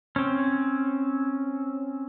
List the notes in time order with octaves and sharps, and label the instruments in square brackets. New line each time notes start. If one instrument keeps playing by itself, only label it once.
[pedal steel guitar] C4 C#4